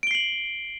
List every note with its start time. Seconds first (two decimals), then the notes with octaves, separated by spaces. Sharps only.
0.03 D7
0.07 G7
0.11 C7
0.15 F#7